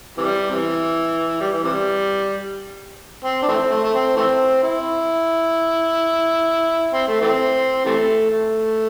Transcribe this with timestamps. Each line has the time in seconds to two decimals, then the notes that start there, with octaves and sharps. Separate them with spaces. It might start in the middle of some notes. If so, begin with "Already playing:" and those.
0.17 C3 E3 G3
0.49 C3 E3
1.41 G3
1.53 E3
1.64 C3 E3 G3
3.24 C4
3.42 D4
3.48 E3 A3 C4
3.70 A3
3.84 A3
3.94 C4
4.16 E3 A3 C4
4.63 E4
6.93 C4
7.07 A3
7.21 E3 A3 C4
7.85 C3 E3 A3
8.31 A3